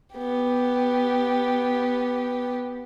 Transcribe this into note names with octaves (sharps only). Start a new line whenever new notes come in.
B3 G4